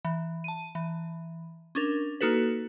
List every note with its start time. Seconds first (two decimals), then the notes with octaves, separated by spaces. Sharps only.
0.05 E3
0.44 A5 D#7
0.75 E3
1.75 C#4 D4 A#4
2.21 A#3 D#4 F#4 A4 B4